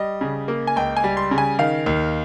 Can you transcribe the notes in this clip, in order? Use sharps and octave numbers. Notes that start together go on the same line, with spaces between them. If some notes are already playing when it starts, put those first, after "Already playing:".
Already playing: G3 D#5
C#3
A#3
G#5
C#2 G5
G#5
G3
C6
C#3
G#5
D#3 F5
D#2